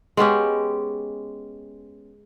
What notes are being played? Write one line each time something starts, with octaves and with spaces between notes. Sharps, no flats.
G#3 B3 C#4 G4